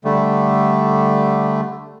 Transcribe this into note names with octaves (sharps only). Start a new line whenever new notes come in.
D3 G3 A3